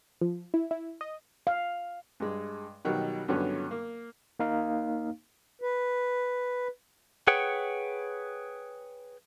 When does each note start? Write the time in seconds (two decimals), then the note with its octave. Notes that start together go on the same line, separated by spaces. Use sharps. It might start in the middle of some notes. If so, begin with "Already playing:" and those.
0.21 F3
0.54 E4
0.71 E4
1.01 D#5
1.47 F5
2.20 G2 G#3
2.85 B2 D#3 F#3 G3
3.28 G2 D3 D#3 F#3 B3 C#4
3.71 A#3
4.39 A#3 D#4 F5
5.62 B4
7.27 G#4 B4 C#5 F#5 G5